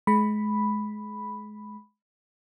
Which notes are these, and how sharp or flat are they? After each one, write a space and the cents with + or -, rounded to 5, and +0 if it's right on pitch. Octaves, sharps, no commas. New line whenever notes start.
G#3 +30 B5 +0